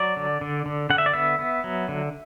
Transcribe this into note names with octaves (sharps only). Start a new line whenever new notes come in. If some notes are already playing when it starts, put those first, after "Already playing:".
Already playing: F#3 D5
D3
D3
D3
D3 F#5
E5
D5
B3 E5
B3
F#3
D3